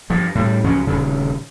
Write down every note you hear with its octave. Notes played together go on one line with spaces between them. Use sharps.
G2 F3
A2 G3
C#2 F3 F#3 C#4
D#1 D2 C#3